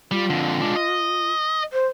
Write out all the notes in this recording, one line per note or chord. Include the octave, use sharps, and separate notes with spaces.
G3 F4
F2 D3
G#3 D4
D#5
C5